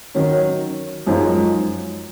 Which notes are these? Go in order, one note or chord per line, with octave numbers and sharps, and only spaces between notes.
D#3 F#3 C#4
F#2 F3 G#3 D#4